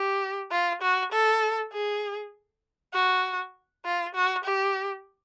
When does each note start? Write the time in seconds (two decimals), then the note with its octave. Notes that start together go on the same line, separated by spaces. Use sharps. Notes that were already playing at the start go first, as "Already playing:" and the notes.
Already playing: G4
0.51 F4
0.82 F#4
1.12 A4
1.73 G#4
2.94 F#4
3.85 F4
4.15 F#4
4.45 G4